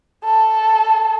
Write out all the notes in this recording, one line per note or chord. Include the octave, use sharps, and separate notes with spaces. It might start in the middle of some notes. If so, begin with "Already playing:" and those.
A4